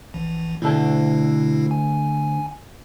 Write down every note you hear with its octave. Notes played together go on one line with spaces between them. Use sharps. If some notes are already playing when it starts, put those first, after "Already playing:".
A#1 E3
D2 B2 D3 E4 A4
G#5